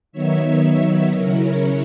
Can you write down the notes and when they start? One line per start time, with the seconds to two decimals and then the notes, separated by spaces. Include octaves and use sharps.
0.12 D#3 F#3 B3 D#4 C#5 E5
1.15 C#3 F#3 C#4 E4 A#4 C#5